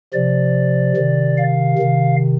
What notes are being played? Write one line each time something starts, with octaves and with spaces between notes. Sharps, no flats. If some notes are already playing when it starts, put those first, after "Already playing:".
C3 F3 D5
C3 D#3
F5
C3 D#3